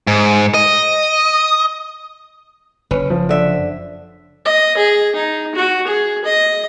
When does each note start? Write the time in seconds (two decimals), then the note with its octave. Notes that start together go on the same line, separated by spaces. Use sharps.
0.07 G#2
0.54 D#5
2.91 F#1 C#4 B4
3.10 F3
3.29 D3 E5
4.45 D#5
4.77 G#4
5.15 D#4
5.55 F#4
5.87 G#4
6.25 D#5